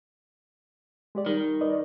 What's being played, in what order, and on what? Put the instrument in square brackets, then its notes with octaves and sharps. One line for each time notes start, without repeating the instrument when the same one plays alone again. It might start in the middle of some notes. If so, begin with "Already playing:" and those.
[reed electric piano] G#3 G4 D5
[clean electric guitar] D#3 [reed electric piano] G3
[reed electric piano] B4 D5 D#5